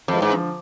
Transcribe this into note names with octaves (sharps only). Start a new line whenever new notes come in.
F2 E3 G#3
G#2
D3 F3